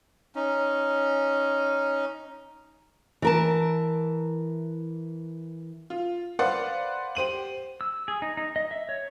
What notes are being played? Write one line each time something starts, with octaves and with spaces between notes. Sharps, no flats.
C#4 D#4
E3 A#4 A5
F4
B4 C5 D5 F5 F#5 C6
G4 C5 D#7 F#7
E6
G#4
D#4
D#4
D#5
E5
C#5